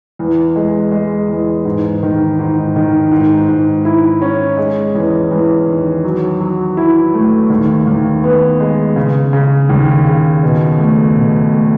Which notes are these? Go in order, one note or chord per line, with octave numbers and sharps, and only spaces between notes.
E2
G#3
G#3
E2
G#2
D#3
G#2
D#3
G#2
G#2
E4
C#4
G#3
E2
E2
D#3
F#3
F#3
E4
A3
D#2
D#2
B3
G#3
C#3
C#3
D#2
C#3
B2
A3
B2
A3